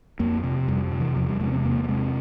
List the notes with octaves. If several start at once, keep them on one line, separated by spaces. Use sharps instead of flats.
F2 A#3
C3
F2 G3
C3
E3
E2 F3
G3
C3 G#3
C#4
C4
G#3
E2 A#3
A#3
C3 G#3